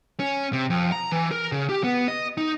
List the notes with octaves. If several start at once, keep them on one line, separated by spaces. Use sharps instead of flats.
C#4
C3
F2
A#5
E3
A#4
C#3
G4
B3
D#5
D#4